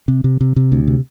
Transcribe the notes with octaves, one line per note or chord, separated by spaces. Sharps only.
C3
C3
C3
C3
D2
C3